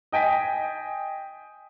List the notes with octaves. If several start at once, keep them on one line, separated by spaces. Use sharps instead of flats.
D#5 G5 G#5 B6